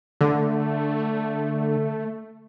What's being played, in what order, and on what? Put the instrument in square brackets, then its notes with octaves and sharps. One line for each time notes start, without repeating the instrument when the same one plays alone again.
[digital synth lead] D3 [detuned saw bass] A3